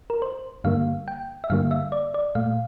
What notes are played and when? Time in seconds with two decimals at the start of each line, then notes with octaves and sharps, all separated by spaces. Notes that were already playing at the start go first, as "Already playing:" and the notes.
0.10 A#4
0.22 C5
0.64 G2 D3 G3 A#3 F5
1.08 G5
1.44 E5
1.50 G2 D3 G3 A#3 F5
1.71 E5
1.92 D5
2.14 D5
2.35 A#2 A3 F5